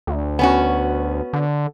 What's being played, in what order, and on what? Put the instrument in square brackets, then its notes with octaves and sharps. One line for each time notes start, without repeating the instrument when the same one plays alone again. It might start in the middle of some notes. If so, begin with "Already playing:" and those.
[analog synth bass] D2
[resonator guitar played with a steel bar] B3 C#4 F#4
[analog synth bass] D3